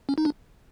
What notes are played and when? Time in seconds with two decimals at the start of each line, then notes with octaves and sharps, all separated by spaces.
0.09 C#4
0.18 D#4
0.25 D4